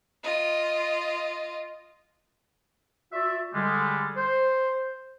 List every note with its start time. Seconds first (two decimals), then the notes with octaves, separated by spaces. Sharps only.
0.24 F4 D#5
3.13 F4 F#4 D5 E5
3.54 D3 G3 G#3
4.17 C5